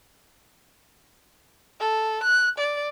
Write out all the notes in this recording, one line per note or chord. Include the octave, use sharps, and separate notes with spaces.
A4
F#6
D5